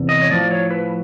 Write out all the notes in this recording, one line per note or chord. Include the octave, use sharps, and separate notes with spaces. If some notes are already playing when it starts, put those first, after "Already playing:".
Already playing: E2 C3
D#5
C#5
A2 F3 D5
C#5
B4